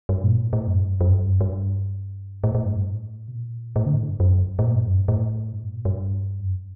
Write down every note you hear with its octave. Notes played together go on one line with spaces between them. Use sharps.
G2
A#2
A2
A2
F#2
G2
F#2
G2
F#2
G2
A2
A2
G2
A2
C3
A#2
A2
D3
A2
G2
F#2
A2
A#2
G2
F#2
G2
A2
G2
A2
A#2
G2
F#2